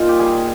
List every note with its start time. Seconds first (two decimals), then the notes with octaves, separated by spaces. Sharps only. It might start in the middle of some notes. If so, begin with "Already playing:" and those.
Already playing: A#2 D#4 F4
0.09 G4
0.19 G3 G#4